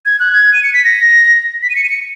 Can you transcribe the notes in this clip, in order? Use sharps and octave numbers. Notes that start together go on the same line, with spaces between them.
G#6
F#6
G#6
D#7
C#7
B6
A#6
B6
D#7
C#7
D#7
C#7